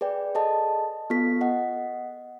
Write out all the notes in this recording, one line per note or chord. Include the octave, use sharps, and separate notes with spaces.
G#4 B4 D5 G5
G#4 A4 D#5 A5
B3 F4 A4 B6
D#5 F#5